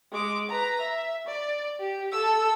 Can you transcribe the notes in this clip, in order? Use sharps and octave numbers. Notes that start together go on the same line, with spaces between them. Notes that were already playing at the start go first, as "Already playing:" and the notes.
G#3 D6
B4 A#5
E5
D5
G4
A4 E6